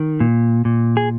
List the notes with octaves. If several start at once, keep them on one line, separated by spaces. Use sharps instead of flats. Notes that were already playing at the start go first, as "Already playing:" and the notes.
Already playing: D#3
A#2
A#2
G#4